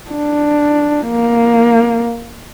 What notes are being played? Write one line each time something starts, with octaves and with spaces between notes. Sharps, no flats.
D4
A#3